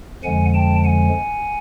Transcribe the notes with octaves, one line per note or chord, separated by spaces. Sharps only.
F2 D3 F3 G#3 F#5 G#5
G5 A5
F#5 G#5